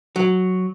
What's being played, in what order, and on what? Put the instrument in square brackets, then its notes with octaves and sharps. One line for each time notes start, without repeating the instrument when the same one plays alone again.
[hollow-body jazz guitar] F#3